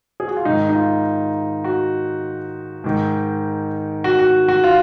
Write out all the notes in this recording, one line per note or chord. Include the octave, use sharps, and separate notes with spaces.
G#4
F#4
F4
G#2 D#3 D#4
D#4
F4
F#4
G#2 D#3
F#4
F#4
F#4
F4